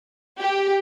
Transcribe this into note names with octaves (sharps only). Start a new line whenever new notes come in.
G4